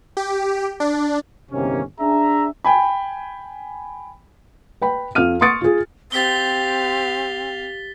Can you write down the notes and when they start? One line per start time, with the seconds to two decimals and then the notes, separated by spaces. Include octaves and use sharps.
0.17 G4
0.80 D4
1.52 G1 E2 C3 D#3 A#3 C#4
2.00 D4 G#4 E5 A#5
2.65 G5 G#5 B5
4.81 B4 G5 B5
5.15 F2 F5 F6 D#7
5.41 C6 C#6 D#6 A6 C#7 D7
5.61 F4 G#4
6.12 C4 G4 F5 A6 B6 G7